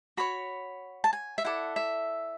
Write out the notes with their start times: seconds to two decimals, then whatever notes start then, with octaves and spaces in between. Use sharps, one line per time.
0.17 F#4 C#5 B5
1.04 A5
1.13 G#5
1.38 E5
1.44 E4 A4 D5 F#5
1.76 E5